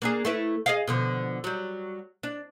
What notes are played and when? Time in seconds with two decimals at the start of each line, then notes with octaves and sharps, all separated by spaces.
0.02 A#3 D4 G#4
0.25 A3 E4 B4
0.66 G#4 D#5 F5
0.87 B2 D3 F3
1.44 F#3 G3
2.23 D4